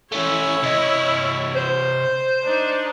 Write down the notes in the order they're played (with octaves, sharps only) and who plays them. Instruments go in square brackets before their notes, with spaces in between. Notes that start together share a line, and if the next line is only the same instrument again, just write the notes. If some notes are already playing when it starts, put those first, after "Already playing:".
[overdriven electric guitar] A3 C#4 [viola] E4 C#5
[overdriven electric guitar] C3 D#5
[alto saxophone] C5
[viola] D4 D#4